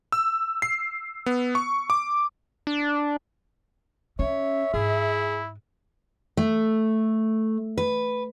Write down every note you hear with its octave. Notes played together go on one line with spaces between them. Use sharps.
E6
C7
B3
C#6
D6
D4
C#4 C#5 E5
G#2 E4 G#4
A3
B4